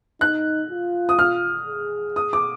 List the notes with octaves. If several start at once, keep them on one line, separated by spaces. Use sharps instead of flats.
D#4 F#6
F4
D#6
F6
G#4
D#6
D6